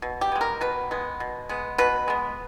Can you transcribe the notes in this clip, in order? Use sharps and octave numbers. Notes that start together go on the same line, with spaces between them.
B2
G4
G#3 B3
A#4
B2 B4
G#3 B3
B2
G#3 B3
B2 B4
G#3 B3